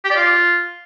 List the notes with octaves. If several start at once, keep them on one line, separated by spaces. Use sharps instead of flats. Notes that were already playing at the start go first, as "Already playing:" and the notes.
G4
D5
F4